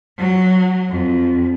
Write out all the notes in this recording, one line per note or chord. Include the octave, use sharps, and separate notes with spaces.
F#3
F2